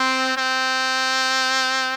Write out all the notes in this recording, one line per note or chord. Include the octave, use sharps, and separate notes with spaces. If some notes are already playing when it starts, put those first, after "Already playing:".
Already playing: C4
C4